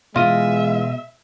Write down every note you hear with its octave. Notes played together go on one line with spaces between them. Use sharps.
B2 E3 G#3 F4 D#5 E5